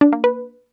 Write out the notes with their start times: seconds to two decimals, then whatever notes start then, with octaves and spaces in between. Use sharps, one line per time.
0.01 D4
0.12 A#3
0.24 B4